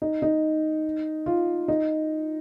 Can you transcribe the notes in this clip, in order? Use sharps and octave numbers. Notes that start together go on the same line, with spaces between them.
D#4
D#4
F4
D#4